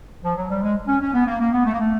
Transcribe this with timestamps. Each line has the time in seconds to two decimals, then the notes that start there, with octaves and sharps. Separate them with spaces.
0.24 F3
0.36 F#3
0.49 G3
0.62 G#3
0.88 C#4
1.01 C#4
1.14 B3
1.26 A#3
1.40 A#3
1.52 B3
1.66 A3
1.73 A#3
1.78 A3